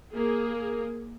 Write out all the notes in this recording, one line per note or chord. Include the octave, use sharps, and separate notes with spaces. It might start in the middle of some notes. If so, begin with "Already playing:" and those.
A#3 G#4